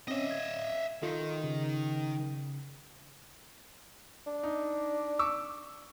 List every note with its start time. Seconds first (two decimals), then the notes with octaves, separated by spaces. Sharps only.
0.08 C4 C#4 C#5 D#5 E5
0.31 G#6
1.02 D#3 D#4 F4 A4
1.44 C#3
4.26 D4
4.43 D#4
5.19 C#6 D6 E6